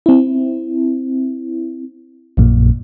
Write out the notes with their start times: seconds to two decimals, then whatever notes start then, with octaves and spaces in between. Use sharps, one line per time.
0.06 C4 E4
2.37 A#1 F#2 A#2